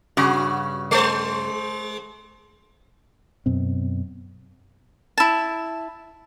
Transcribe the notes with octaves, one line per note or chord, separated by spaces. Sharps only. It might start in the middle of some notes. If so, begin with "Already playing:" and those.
G2 C#3 F#4
G#3 C5
F#2 B2 C4
E4 A5